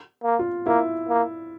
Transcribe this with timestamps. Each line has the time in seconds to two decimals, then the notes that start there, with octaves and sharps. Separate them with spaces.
0.24 A#3
0.39 F4
0.66 A#3 E4
1.09 A#3